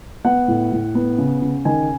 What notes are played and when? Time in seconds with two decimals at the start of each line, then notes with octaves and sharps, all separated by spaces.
0.24 B3 F#5
0.48 A2
0.72 A2
0.95 B3
1.18 C#3
1.42 C#3
1.65 D#3 G#5